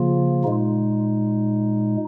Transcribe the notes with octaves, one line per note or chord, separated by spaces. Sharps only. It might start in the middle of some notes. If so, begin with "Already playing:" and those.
Already playing: C#3 F3 A#3 F4
A#2 G#3 D#4